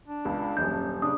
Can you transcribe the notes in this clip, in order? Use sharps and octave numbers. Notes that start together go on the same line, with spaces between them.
D4
C#2
D#1 F#2 G6
C#3 D4 D#6